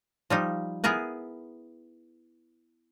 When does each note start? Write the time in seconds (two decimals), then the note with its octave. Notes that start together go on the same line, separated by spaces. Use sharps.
0.30 F3 G3 D#4
0.84 B3 E4 G#4 A#4 B4